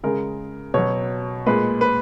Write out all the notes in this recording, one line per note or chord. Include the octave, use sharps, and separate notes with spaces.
C#3 G#3 A#4
B2 F#3 C#5
A#2 G#3 B4
B4